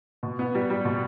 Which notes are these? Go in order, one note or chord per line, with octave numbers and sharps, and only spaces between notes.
B2
B3
G3
G3
B2